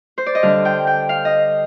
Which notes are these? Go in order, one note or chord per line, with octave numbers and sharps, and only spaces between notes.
C5
D5
D#5
D3 G3 D4 F5
G5
G5
F5
D#5